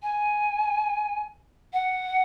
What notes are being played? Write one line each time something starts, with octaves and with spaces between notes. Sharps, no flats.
G#5
F#5